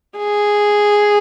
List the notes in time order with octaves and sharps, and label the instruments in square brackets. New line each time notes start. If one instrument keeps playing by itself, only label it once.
[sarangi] G#4